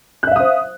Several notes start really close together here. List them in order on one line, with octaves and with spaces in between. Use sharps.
F#6 E5 F5 D#6 C5